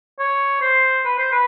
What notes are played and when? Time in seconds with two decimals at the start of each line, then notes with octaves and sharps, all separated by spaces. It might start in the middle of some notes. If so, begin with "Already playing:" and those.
0.19 C#5
0.62 C5
1.05 B4
1.18 C5
1.32 B4